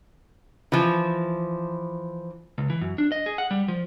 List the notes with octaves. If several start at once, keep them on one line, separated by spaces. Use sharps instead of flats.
E3 F3
C#2
E3
F#2
D4
D#5
G#4
F#5
G3
F3